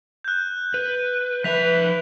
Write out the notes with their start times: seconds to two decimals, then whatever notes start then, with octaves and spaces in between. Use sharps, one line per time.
0.24 F#6 G6
0.74 B4
1.44 F3 B4 E5 B6 F7